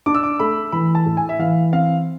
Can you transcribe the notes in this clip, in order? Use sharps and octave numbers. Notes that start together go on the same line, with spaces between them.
D4 D6
E6
D6
A3 B5
E3 B5
A5
A2
G#5
E5
E3 F5
C4 F5